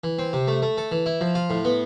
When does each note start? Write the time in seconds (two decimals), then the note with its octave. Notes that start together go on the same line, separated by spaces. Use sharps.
0.04 E3
0.19 C4
0.33 C3
0.48 A3
0.62 A3
0.78 A4
0.92 E3
1.06 E4
1.21 F3
1.35 F4
1.50 A2
1.65 B3